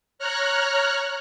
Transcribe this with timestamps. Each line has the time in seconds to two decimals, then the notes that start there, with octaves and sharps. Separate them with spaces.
0.19 C#5 A#5 F6 F#6